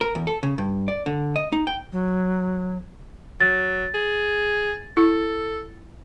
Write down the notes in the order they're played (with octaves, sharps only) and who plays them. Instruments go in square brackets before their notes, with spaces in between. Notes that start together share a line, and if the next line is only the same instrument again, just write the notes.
[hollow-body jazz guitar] A#4
E2
A4
C#3
G2
D5
D3
D#5
D#4
G5
[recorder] F#3
[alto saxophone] F#3 [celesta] A6
[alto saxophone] G#4
[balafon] E4 [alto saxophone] A4